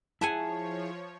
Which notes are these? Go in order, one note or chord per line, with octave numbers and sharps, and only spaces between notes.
F3 E4 G#4 C#5 E5 F#5 G#5 A5